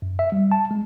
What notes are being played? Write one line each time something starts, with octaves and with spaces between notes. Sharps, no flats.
F#2
E5
G3
A5
G#3